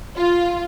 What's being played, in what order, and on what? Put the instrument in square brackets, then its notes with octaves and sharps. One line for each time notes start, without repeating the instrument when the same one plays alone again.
[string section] F4